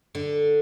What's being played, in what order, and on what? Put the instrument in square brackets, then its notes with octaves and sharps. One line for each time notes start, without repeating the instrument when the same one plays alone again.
[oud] D3